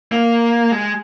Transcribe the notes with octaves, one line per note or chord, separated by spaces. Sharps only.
A#3
G#3